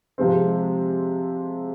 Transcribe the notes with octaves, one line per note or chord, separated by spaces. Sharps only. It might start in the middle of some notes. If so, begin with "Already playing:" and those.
C3 F3 G#3 C4